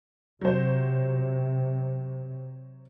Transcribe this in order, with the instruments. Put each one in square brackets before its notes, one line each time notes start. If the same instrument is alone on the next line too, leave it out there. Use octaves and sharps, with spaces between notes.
[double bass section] C3 [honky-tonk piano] F#3 C5